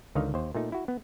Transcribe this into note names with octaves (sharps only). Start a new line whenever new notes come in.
C#2 D3 D#3 D#4 D#5 F5
D#2 C5
A#2 A3 D#4
E4 F#4
B3